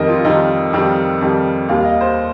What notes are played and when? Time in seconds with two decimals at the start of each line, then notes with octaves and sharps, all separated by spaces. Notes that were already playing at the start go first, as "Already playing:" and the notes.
Already playing: F2 D#3 G3 A#4 D#5
0.09 F4
0.24 F2 D#3 G3 D#4
0.73 F2 D#3 G3 G5
1.21 F2 D#3 G3
1.69 D#2 D#3 G3 F5
1.80 F5
1.84 D#5
2.01 C5